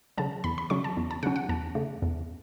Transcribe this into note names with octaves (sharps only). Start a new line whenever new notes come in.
C#3 F#3 C#4 A5
E2 B5
B5
C#3 F#3 C#4 C#6
A5
E2
A5
C#3 F#3 C#4 F#5
F#5
E2 A5
C#3 A3
E2